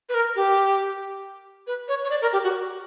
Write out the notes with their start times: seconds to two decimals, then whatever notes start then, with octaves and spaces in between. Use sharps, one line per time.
0.09 B4
0.14 A#4
0.36 G4
1.67 B4
1.88 C#5
2.04 C#5
2.10 D5
2.22 A#4
2.33 G4
2.44 F#4